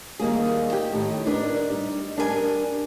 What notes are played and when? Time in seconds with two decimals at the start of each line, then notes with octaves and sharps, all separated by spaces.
0.19 D#3 G3 A#3 G#4
0.73 G4 G5
0.93 A2 D#3
1.27 D4 D#4 A#4 B4 D5
1.70 G3 D#4
2.17 G2 D4 G4 A#4 B4 G#5